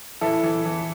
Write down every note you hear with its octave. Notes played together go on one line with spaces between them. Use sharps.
E3 E4 A4
E3
E3